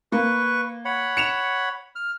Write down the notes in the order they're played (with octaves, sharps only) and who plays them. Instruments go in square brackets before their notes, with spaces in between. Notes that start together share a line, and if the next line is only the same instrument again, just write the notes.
[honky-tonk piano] A#3 [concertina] B4 C#6
[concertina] C#5 F#5 B5
[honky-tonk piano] C#7 E7 F7
[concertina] F6